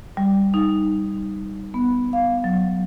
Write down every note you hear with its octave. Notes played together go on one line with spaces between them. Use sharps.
G3
D#4
B3
F5
F#3